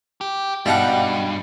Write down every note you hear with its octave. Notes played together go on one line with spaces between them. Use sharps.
G4
G2 B2 G3 D#4 F5 F#5